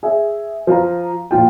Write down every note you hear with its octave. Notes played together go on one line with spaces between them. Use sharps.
G#4 E5
F3 F5 A#5
A#1 F4 G5